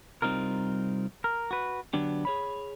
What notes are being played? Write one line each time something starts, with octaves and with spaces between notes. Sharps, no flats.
C2 G3 C4 D#4 F4 A#4
A#4
F#4 B4
D3 F#3 B3 D4 G4
G#4 C#5 B5